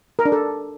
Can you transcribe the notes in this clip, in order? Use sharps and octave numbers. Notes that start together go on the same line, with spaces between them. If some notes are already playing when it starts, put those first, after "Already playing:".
A#4
D4
A4